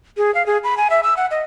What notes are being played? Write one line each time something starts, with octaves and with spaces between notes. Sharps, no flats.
G#4
F5
G#4
B5
G#5
E5
E6
F#5
D#5